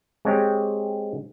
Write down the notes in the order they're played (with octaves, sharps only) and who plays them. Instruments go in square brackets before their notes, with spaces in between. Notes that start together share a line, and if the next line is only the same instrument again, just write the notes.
[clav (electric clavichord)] G#3 C4 G4 C#5